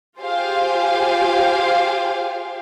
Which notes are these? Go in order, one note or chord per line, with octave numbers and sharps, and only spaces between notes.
F4 G4 G#4 C5 F5 G5